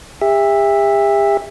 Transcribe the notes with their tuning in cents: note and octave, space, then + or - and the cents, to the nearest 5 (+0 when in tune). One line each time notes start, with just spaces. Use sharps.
G4 +45 E5 +0